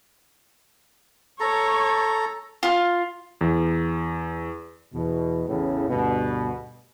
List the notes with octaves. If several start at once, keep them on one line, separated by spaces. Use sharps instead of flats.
A4 C#5 A#5
F4
E2
E2 B2
A1 E2 A2 C#3
D2 G2 B2